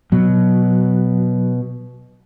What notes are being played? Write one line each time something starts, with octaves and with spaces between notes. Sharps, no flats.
B2 F#3